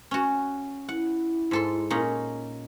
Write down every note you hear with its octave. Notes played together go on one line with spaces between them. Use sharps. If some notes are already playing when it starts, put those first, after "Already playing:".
C#4 F#4
E4 F#5
G#2 A4 C6
A#2 C#4 D#4